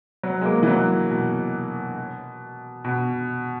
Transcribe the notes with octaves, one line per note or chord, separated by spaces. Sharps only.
F#3
G#3
A#3
E3
F#3
B2
B2